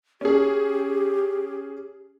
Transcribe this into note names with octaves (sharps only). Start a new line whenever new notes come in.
C#4 G4 G#4